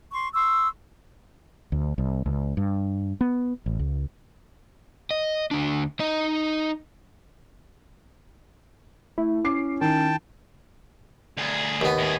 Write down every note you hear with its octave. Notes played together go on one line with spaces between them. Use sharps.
C6 C#6
C6 C#6 E6
D2
C2
C#2
G2
B3
A1
C#2
D#5
D2 D4
D#4 D#5
A3 E4
C#4 D6 C7
D#3 G5 A5
D2 G#4
D#2 B3
A2 G#4